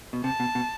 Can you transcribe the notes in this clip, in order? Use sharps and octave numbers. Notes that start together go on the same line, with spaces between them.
B2
C3 A5
B2
B2